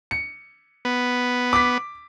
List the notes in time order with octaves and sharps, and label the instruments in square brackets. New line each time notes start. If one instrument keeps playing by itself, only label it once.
[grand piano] C#7
[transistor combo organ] B3
[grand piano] D6 B6